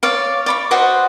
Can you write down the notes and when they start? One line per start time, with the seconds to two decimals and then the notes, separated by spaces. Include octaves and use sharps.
0.03 C#5 D5 F5
0.46 D5 B5 C#6
0.71 F#4 B4 C5 D#5